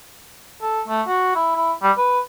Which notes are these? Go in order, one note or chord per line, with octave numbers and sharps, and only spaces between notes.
A4
A3
F#4
E4
E4
G3
B4